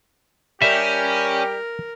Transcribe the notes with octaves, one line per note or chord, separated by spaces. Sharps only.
G3 C#4 G4 A#4 E5